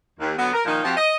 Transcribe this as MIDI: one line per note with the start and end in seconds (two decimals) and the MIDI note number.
0.20 0.33 39
0.37 0.49 50
0.37 0.49 54
0.37 0.49 59
0.52 0.64 70
0.65 0.83 46
0.65 0.83 51
0.65 0.83 53
0.65 0.83 63
0.84 0.94 53
0.84 0.94 60
0.84 0.94 66
0.84 0.94 67
0.96 1.17 75